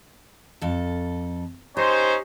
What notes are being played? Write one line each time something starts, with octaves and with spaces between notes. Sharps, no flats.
F2 A4
C#4 D#4 G4 C5